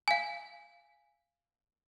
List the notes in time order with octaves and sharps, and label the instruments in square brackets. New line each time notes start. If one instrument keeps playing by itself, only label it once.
[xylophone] F5 G#5